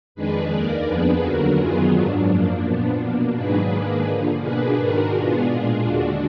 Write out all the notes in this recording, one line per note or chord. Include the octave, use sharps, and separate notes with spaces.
F2 D#3 G#3 D4 G#4 B4
D#2 D#3 A#3 A#4 D5
F2 F3 B3 D4 G#4 B4
D#2 D3 F#3 F#4 A#4
F#2 D#3 F#3 B3 F4 G#4
G#2 F#3 D4
F#2 F3 A#3 D4
A#2 F3 B3 D4
B2 A#3 D4
G#2 D#3 F#3 A#3 D4 G#4 B4
G#2 D#3 A#3 D4
D3 F3 A#3
B2 A#3 D4 G#4 B4
G#2 D#3 G#3 D4 F#4 A#4
B2 G#3 B3 D4 F4 G#4
A#2 G#3 D4
D#2 D3 G#3 D4 F#4